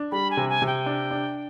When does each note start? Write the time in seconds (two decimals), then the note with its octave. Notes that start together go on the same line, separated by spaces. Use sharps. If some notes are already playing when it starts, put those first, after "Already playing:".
Already playing: D4
0.12 G3 B5
0.31 G#5
0.37 C3
0.49 G#5
0.62 C3 G5
0.86 D4
1.11 D4